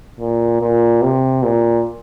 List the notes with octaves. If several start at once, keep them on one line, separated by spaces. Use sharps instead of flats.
A#2
A#2
C3
A#2